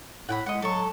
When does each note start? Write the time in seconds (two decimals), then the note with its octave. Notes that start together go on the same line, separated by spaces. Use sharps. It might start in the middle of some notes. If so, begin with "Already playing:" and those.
0.29 A2 F#5 G5 B5
0.46 G#3 D#5 F#5
0.62 F#3 A4 C#6